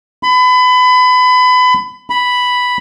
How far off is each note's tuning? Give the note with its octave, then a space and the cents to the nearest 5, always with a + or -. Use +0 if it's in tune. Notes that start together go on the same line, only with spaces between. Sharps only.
B5 +30
B5 +0